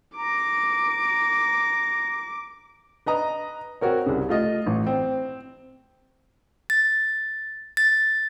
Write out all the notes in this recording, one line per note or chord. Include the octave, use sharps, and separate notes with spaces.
A#5 D6
B4 D#5 A#5 D#6
C4 F#4 A#4 C#5
C2 C#3
A3 F4 D#5
A1
C4
A6
A6